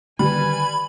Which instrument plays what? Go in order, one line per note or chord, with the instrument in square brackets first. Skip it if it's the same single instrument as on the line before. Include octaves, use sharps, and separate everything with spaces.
[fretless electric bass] D3 D#3 [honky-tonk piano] G3 [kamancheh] B4 G#5 [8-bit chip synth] B5